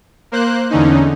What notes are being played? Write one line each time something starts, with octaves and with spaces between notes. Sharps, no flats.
A#3 C5 F#6
E2 D3 C#4 D#4